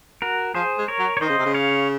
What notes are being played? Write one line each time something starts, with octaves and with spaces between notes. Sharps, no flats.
F#4 A#4
F3 G#4 C5
G#3
A#4 C#5
F#3
C#5
D#3 C5 D#5
C#3
C3
C#3
C#5 F5